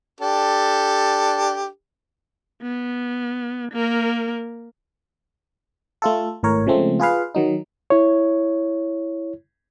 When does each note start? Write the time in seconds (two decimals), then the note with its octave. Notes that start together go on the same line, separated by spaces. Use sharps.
0.21 D4 G4 A4
2.62 B3
3.72 A#3 A#4
6.02 A3 F4 A4
6.43 G#1 A2 A#4 C#5
6.67 C#3 F3 G#3 A3 C4
7.00 F4 G#4 B4 F5
7.35 D#3 F#3 D#4
7.90 E4 C#5